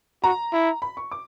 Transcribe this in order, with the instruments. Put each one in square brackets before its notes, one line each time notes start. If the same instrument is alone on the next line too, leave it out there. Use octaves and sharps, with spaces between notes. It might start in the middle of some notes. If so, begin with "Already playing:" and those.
[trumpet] F#4 [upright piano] A#5
[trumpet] E4
[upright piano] B5
C#6
D6